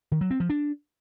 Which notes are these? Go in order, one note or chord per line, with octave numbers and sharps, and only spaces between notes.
D#3
F#3
C4
F3
D4